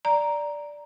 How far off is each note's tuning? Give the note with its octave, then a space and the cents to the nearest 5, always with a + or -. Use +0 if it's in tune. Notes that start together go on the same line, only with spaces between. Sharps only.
D5 +0 A#5 +0